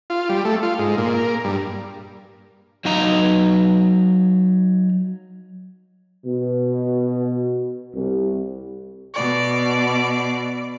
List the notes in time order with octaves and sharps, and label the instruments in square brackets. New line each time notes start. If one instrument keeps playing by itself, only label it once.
[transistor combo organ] F4
G3
A3
F4
G#2
A#2
A#3
G2
[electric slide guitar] F#3 D#4 F5 A#5
[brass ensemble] B2
C2
[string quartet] B2 D5